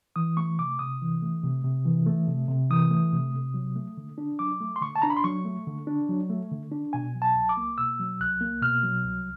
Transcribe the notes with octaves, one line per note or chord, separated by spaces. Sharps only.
E3 D#6
A3 C#6
C3 D6
C3 D#6
E3
A3
C3
C3
E3
A3
C3
C3
E3 D#6
A3
C3
C3
F#3
A3
D3
D4
F#3 D6
A3
C6
D3 C#6
A5
D4 A#5
B5
C6
F#3 C#6
A3
D3
D4
F#3
A3
D3
D4
B2 G#5
F#3
A5
C2
D6
A#3
B2 E6
F#3
C2 F#6
A#3
B2 F6
F#3
C2